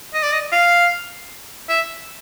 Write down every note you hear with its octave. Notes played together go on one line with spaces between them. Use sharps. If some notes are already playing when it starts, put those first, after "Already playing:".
D#5
D5
D#5
F5
E5